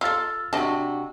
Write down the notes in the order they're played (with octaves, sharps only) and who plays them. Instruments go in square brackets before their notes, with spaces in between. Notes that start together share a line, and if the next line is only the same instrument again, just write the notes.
[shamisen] F4 A4 [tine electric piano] E6 F6 A6
[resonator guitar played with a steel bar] C3 F#4 [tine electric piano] D4 [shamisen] D#5 A5